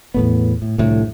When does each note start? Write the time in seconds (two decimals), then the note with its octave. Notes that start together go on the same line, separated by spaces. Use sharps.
0.14 E2 A2 B3
0.62 A2
0.78 C2 F2 A2 D3